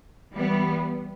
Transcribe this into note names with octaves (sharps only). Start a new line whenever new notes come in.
E3 G3 B3